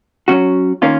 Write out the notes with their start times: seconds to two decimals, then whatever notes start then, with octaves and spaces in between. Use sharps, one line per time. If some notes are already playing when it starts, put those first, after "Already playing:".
0.28 F#3 C#4 F#4
0.82 D#3 A#3 C#4 F4